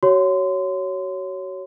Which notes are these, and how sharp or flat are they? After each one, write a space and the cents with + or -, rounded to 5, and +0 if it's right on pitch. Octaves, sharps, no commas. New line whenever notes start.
F#4 +35 C#5 +0 C6 -30